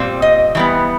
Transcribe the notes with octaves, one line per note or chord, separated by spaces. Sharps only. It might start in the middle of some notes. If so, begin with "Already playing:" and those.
Already playing: A#2 G3 C4
D#5
E3 G3 B3